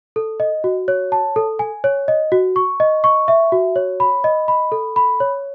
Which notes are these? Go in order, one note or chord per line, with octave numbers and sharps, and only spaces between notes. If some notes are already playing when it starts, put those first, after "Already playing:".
A4
D#5
F#4
C#5
A5
A4
G#5
C#5
D#5
F#4
C#6
D#5
C#6
E5
F#4
C#5
B5
D#5
B5
A4
B5
C#5